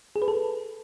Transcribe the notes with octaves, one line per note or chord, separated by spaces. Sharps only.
G#4
B4
A4